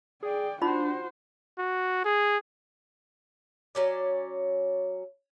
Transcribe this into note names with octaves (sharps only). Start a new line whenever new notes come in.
G#4 D5 G5
D4 D#4 F4 F#4 C5 B5
F#4
G#4
F#3 C#4 D5